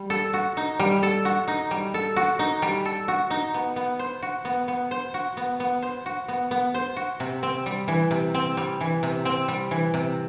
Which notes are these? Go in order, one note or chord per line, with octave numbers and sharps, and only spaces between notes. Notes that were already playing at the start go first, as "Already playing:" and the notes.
Already playing: G3
A4
F#4
D#4
G3
A4
F#4
D#4
G3
A4
F#4
D#4
G3
A4
F#4
D#4
B3
B3
C5
F#4
B3
B3
C5
F#4
B3
B3
C5
F#4
B3
B3
C5
F#4
C3
C4
G3
E3
C3
C4
G3
E3
C3
C4
G3
E3
C3